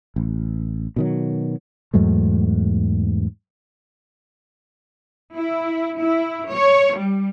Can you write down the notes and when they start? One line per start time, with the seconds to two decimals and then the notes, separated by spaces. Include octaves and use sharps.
0.16 A1
0.96 B2 D#3 F#3
1.94 E2 G#2 F#3 A3
5.35 E4
6.01 E4
6.52 C#5
6.97 G3